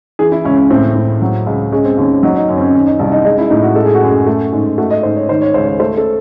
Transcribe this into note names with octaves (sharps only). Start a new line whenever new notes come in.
E3 G#4
E4
C#2 C#4
C#4
A2 C4
A2
F#3
C#2
G#3 C#4
C4
D#2 C#4
F#3 D#4
D#4
F#2 C#4
C4
C#4
D#3 C#4
D#4
C2 D#4
D#4
G#3 D#4
E4
A2 D#4
F#4
G#3 A4
G#4
F#4
F#2 G#4
A3
G#2
A3 F#4
D#5
G#2 C5
C#5
D#3 C5
C#5
C#2 C5
C#5
A3 C5
A4